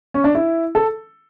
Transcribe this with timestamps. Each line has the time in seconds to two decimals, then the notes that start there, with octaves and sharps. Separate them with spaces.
0.14 C#4
0.24 D4
0.35 E4
0.75 A4